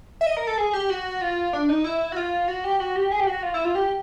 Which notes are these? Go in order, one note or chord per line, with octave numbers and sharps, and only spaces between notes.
E5
D#5
A#4
A4
G#4
G4
F#4
F4
D4
D#4
E4
F#4
F4
F#4
G4
F#4
G4
G#4
G4
F#4
F4
E4
F4
G4